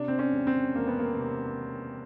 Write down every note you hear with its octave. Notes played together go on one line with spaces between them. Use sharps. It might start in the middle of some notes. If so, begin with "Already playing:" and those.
Already playing: C3 D4
C4
C#4
E1
C4
E1 A#3
B3
A#3
C3